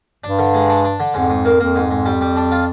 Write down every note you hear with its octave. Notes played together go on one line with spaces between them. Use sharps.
G2 D4
D3
G#3
D4
D4
D3
F2 G#2
G#2
A#3
F2 A#3
G#2
G#2
G3
G3
D4
F4